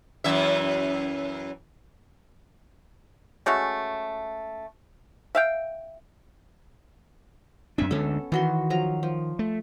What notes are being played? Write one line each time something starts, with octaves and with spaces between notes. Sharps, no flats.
F#2 E3 E5
G#3 A3 C#4 F#4
E5 F5 G5
F#2 C4 D4 E5 G#5
D2 D3 G#3 B3 C#4 A4
D#3 E3 F#4 C6
F3 F#3 A#5
F3
A3